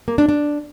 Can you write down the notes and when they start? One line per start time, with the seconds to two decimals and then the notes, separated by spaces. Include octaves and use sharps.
0.08 A#3
0.18 D4
0.29 D4